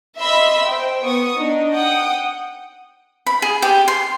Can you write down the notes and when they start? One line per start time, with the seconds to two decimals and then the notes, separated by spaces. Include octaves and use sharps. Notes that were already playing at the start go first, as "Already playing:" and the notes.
0.20 D#5 E5 B5 C6 E6
0.68 C5 G5
1.05 B3 C#6 D#6
1.39 D4 D#4
1.73 F#5 G5 D#6
3.26 B5
3.42 G#4
3.62 G4
3.88 C6